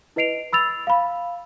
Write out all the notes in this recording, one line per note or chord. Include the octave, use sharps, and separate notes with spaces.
E4 B4 D#5 C7 D7 F7
B5 E6 A6 F7
F5 B5